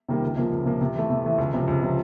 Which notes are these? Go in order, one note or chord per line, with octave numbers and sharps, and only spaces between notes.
C3 D#3 G3 A#3
C#2
C3 F3 A#3
C#2
C3 F3 A#3
C3
E3 A3
C3
E3 A3
C#2
C3 F3
C#2
C3 F3